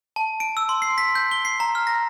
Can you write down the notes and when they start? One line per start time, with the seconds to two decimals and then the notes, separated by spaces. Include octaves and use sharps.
0.16 A5
0.40 D7
0.57 E6
0.69 C6
0.82 C7
0.98 B6
1.15 G6
1.31 G7
1.45 C7
1.60 A#5
1.75 F6
1.87 A#6